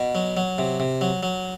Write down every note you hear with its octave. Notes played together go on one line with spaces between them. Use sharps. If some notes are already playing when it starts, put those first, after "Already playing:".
Already playing: B2
F#3
F#3
C3
C3
F#3
F#3